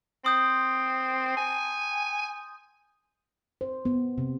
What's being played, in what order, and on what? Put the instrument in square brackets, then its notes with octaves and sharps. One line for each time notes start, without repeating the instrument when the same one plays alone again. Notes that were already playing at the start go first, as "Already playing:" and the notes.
[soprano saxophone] C4 [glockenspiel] C6 D#6 G6
[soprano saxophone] G#5
[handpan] C5
B3
C3